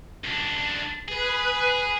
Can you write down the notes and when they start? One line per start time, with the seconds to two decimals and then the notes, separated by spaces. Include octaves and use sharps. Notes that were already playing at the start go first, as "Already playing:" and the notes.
0.24 C#2 D4
1.08 G#4 B4